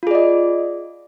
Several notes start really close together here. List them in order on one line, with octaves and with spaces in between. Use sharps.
F4 G#4 D5 D#5